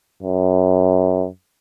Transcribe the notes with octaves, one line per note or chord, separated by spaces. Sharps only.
F#2